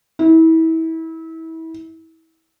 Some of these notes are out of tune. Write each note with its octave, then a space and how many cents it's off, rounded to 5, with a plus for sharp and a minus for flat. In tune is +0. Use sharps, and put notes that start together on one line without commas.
E4 -30